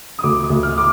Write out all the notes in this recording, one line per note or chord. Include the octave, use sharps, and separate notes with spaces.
D#6
D2 D6
D#6
D2
F6
D6